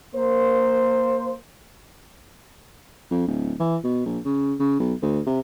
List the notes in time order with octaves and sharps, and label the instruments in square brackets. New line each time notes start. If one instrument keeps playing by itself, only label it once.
[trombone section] A#3 C5
[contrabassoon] F2
D1
E3
B2
A#1
C#3
C#3
B1
D2
C3